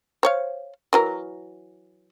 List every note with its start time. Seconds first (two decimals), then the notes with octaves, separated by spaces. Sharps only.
0.23 C5 C#5 F5
0.93 E3 F#3 A#4